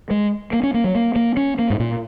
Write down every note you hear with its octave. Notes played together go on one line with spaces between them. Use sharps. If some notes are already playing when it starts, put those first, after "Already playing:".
G#3
A#3
C#4
A#3
F#3
A#3
A#3
C#4
A#3
G#2
A#2